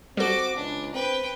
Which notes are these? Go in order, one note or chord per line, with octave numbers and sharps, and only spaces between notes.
G3 C4 F#4 A4 D6
C#2 D4
C4 B4 G5